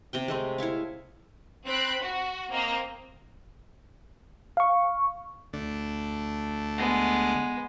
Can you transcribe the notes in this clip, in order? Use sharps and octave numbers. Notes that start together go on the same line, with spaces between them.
C3 G4 G5
G#3 A3 C4
E4 C#5 E5 F5
C4 B5 F#6 D7
F#4
A#3 C4 D#5
F5 C#6
D2 A3 D4
G#3 B3